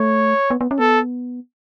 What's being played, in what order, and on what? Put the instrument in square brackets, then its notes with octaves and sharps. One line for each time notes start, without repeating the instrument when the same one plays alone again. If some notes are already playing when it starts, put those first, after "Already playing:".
Already playing: [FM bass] A3 [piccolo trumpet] C#5
[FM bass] B3
B3
C#4
[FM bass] B3 [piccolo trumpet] A4